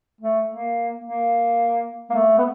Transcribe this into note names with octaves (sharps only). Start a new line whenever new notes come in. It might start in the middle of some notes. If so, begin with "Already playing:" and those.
A3
A#3
A#3
A#3
A3
B3